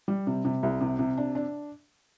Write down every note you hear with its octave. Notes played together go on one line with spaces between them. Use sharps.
G3
C3
C3
C2
C3
C3
D4
D4